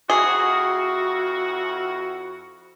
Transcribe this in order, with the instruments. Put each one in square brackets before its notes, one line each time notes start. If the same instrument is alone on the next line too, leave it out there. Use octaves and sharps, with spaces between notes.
[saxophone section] F2 E4 F#4 [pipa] G#4